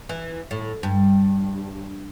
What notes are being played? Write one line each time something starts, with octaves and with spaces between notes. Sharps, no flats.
E3
A2
G2